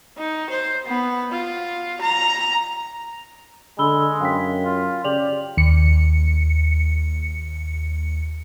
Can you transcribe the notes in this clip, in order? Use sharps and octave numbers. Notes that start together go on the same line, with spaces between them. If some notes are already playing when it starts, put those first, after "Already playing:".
D#4
C5
B3
F4
A#5
D3 G#3 B5 E6 G7
F#2 F5 G5 B6
F4
C#3 G4 D5 F7 F#7
D#2 C#7